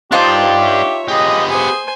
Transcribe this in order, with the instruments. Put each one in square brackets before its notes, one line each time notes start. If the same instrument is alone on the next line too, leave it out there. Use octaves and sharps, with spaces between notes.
[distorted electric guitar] D4 G5 [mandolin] D#4 F4 A5 [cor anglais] G4 [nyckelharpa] C5
[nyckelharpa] C#5 E5
[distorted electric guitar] B3 G4 [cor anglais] G#4 [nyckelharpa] D#5
[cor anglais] G#4 [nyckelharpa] C5 G#5